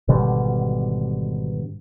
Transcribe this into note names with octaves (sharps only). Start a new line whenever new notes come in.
G#1 B2 D3 G3